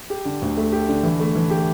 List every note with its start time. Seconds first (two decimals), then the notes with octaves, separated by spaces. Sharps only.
0.10 G4
0.25 D3
0.42 D2
0.57 A3
0.72 G4
0.89 D3
1.03 E3
1.20 A3
1.35 E3
1.50 G4